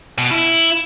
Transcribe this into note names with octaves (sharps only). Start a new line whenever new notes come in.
B2
E4